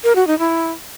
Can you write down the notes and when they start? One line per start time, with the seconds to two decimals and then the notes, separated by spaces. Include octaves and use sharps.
0.04 A#4
0.16 F#4
0.27 D#4
0.39 E4